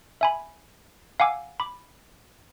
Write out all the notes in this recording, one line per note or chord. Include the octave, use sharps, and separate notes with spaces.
E5 G#5 B5
F5 F#5 G#5 D6 E6
B5 D6